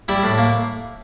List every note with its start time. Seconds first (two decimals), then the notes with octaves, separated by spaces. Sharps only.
0.08 G3 E4
0.23 A2
0.38 A#3